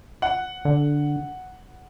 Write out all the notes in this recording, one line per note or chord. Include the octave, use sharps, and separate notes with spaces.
F#5
D3